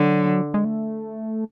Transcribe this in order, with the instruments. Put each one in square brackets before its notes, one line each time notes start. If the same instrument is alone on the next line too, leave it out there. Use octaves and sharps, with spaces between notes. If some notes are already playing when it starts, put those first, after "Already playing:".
Already playing: [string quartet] D3 [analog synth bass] F#3
[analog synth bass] G#3
A3